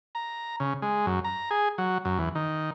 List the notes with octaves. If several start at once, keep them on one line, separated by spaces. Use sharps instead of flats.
A#5
C#3
G#3
F#2
A#5
G#4
F#3
F#2
E2
D#3